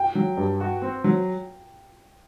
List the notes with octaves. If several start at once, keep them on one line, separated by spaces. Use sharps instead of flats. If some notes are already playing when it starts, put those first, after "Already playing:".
Already playing: G5
F#3
G2
F#4
C4
F#3